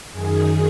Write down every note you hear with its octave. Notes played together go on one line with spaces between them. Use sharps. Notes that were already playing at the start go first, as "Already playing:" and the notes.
F#2 D#3 G#4